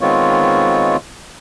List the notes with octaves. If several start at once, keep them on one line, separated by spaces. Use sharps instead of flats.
D#3 G#3 B3 C4 F4 C#5